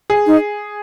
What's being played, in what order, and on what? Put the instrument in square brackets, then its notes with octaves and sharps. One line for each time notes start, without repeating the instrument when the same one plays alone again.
[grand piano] G#4
[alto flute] D#4